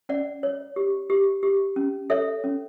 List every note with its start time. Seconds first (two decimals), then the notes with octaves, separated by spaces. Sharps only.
0.09 C#4 D5 F#5
0.43 C#5
0.76 G4
1.10 G4
1.43 G4
1.76 C#4
2.10 A4 C#5 E5
2.44 C#4